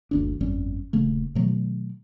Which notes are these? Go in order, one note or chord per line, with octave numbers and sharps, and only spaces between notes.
F#1 D2 D4
G1 F2 G3 C#4
D#1 C#3 A3
B2 D#3 F#3 A3